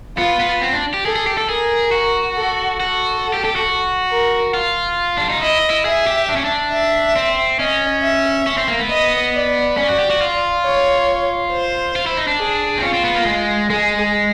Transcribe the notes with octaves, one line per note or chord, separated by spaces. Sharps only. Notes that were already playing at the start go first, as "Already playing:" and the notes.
B3 F4
B3
C4
D4
G4
G#4 A4
G#4
G4
A4
G#4 A#4
F#4
A4
F#4 A4
G4
G4
F#4
A#4
F4
D4
D#4
E4 D#5
E4
G#4 E5
G4
D4
C#4
D4
E5
C4
C#4 D#5
E5
C#4
C4
A#3
B3
D#5
D5
C#4 D5
F#4
G4
F#4
F4
C#5
C5
F4
E4
D#4
D4
G#4
C4
C#4 F4
C4
B3
A#3
G#3
G#3 G#4